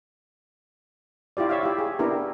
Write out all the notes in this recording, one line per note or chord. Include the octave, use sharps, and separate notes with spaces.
E4 F4 G4 D5
C#5 E5 F5
E4 G4
G#4
B3 D4 E4 G4 A#4